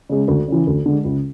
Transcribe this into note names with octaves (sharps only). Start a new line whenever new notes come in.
C#3 G#3
D2
C#3 E3
D2
D3 G#3
C#2